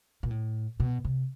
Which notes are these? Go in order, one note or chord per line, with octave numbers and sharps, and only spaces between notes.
A#2
A2
B2
C3